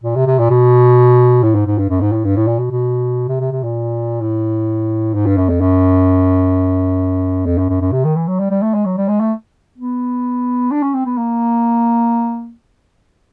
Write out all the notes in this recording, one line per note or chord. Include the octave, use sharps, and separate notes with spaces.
A#2
C3
C3
A#2
B2
A2
G#2
G#2
G2
F#2
G#2
A2
G2
A2
A#2
B2
B2
C3
C3
C3
A#2
A2
G#2
G2
F#2
F2
F#2
F2
F#2
F#2
F#2
C3
D#3
E3
F#3
G3
G3
A3
G#3
F#3
G3
G#3
A3
B3
D4
C#4
C4
B3
A#3